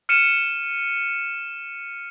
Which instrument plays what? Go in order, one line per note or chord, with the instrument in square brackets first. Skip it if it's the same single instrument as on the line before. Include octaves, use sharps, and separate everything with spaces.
[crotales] F6 C#7 D#7 E7